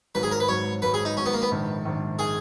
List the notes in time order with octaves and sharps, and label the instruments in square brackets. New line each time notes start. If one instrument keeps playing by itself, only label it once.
[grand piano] G#1 G#2 F#3 [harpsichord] B4
[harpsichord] G#4
A#4
B4
[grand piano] G#1 G#2 F#3 [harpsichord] C#5
[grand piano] G#1 G#2 F#3 [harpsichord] B4
[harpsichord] G#4
D#4
[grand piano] G#1 G#2 F#3 [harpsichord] C#4
[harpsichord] B3
A#3
B3
[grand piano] A#1 G#2 D#3
A#1 G#2 D#3
[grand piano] D#3 [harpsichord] G#4